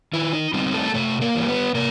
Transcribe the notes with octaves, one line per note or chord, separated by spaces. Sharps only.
D#3 E4
D#4
G3 C4 D#4 E4
A3 A4
C3 A3 A4
A#3 A#4
E3 G3
B3 B4
C3 A#3 A#4